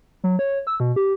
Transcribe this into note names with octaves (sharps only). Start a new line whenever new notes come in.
F#3
C#5
E6
B2
G4